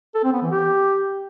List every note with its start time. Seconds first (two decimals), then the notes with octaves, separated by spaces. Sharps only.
0.15 A4
0.24 C4
0.33 B3
0.42 E3
0.51 G4